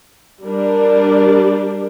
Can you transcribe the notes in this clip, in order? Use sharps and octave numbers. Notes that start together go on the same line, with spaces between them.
G3 D4 A#4